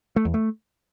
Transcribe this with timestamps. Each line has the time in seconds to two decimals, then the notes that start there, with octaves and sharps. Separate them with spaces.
0.16 A3
0.25 E2
0.34 A3